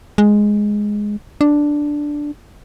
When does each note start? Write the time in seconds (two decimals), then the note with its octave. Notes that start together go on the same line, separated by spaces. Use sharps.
0.18 G#3
1.41 D4